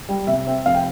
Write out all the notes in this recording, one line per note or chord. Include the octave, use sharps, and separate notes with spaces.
G3
C3 E5
C4
F1 F5
G5